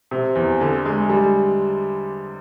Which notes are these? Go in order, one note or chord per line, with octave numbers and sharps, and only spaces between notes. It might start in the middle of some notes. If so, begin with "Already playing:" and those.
C3
E2
D3
G#3
G3